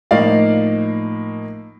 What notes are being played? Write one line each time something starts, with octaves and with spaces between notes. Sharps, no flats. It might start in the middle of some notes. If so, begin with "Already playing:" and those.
A2 F3 A#3 D#4 D5 F5